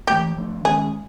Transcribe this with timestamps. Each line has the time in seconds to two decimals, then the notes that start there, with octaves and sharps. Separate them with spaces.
0.07 E3 A3 C4 G4
0.36 F3 A3 D4
0.65 D#3 G#3 C#4 G#4